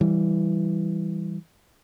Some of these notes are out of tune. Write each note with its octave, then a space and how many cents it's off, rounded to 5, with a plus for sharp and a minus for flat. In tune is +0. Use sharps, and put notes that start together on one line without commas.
E3 +0 G3 -5